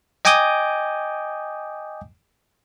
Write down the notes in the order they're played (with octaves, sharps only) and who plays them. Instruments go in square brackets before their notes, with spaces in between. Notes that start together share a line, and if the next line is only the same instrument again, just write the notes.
[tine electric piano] D#5 G5 G#5 D6 D#6 G6